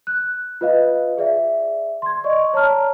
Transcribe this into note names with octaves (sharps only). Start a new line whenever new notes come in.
F#6
F4 B4 D#5 F5
G#4 D5 E5
C6 G#6
D5 D#5 C#6
C#5 A5 A#5 F6